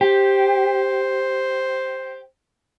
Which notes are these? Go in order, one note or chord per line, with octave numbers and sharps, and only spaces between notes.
G4 C5